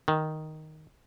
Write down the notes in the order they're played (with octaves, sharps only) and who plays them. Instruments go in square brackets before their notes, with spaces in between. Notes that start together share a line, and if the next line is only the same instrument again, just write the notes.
[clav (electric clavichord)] D#3